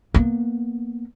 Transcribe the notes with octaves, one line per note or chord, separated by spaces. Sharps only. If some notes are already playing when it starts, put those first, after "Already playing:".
A#3 B3